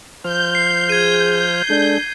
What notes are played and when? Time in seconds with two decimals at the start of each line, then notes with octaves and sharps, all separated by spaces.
0.24 F3 C5 F6 G6
0.55 C7
0.89 G#4 G#6 D#7
1.70 G#3 D4 A4